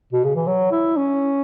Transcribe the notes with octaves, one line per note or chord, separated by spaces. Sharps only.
B2
C#3
E3
F#3
E4
C#4